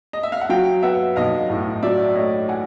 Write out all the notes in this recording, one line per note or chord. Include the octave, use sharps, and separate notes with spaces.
D#5
E5
F5
F#5
F#3 F5 G5
B3 E5 F#5
B1 D#5 F5
A2
F#3 D5 E5
A3 C#5 D#5
F#5 G#5